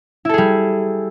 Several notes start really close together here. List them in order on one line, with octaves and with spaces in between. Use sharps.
E4 A4 G#4 G3